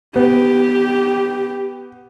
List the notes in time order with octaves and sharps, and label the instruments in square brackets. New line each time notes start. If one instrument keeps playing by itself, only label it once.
[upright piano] B3 [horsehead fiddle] G4